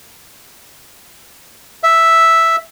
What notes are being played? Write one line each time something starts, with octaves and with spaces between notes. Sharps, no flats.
E5